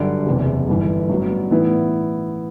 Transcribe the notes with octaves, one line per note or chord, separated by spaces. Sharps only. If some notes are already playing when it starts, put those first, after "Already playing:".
Already playing: G1 F#2 D3 G3
F#1 E2 C3
G1 G2 E3
A1 G2 F#3 B3
A2 E3 B3 E4